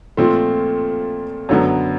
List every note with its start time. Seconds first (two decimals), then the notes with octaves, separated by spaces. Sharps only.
0.17 A#2 F3 A3 C4 F4
1.49 F#2 D3 F#3 B3